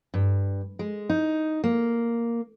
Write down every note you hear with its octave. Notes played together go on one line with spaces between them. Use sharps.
G2
G#3
D#4
A#3